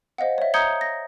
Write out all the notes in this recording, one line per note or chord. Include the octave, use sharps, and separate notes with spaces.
C5 D#5 F5 F#5
C#5 E5
A#5 D#6 G6 G#6 C#7 G7
A#6